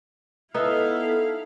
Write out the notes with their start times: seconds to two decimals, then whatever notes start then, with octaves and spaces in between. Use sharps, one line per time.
0.55 B3 D#4 E4 A4 E5 F5